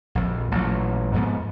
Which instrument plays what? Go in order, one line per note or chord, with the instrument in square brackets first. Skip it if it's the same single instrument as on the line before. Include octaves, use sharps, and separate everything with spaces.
[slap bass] A#1 F2
A1 A#2 F#3
F2 G#2 G3 B3